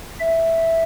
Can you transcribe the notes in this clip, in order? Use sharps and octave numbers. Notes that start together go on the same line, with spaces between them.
E5